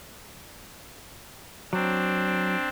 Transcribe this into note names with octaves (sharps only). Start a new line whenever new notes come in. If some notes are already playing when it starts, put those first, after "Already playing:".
F#3 C4 D4